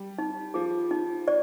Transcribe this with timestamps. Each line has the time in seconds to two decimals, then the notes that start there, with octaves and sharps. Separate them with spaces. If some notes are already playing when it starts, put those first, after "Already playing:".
Already playing: G3
0.18 D#4
0.54 F3 G#4
0.91 D#4
1.28 D5